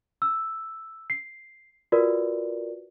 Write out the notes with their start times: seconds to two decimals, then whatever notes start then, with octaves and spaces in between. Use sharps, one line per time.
0.22 E6
1.10 C7
1.92 F4 F#4 A#4 B4 D5